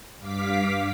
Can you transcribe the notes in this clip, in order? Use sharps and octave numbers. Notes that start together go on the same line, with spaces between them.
G2 F5 D6 B6